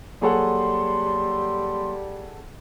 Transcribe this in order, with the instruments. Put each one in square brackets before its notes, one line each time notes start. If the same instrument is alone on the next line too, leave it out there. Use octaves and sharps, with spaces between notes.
[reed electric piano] F#3 A#3 C#5 [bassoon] G3 [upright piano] G#4 A4 F#5 [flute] C6